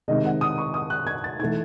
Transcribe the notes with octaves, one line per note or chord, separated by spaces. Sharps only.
C3 D#3 G#3 D#5
F#5
D#6
C#6
D#6
F#6
G#6
A6
E3 A3 D#4 G#6